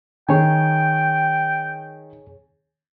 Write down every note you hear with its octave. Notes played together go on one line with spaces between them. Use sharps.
D#3 G#4 C#5 G5 G#5